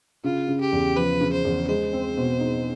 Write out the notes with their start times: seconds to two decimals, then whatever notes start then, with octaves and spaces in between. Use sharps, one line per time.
0.24 C#3 F4
0.48 C#3
0.61 G4
0.72 E2
0.96 F3 B4
1.21 C#3
1.33 C5
1.45 E2
1.68 G#3 C5
1.93 C4
2.17 B2
2.40 D#4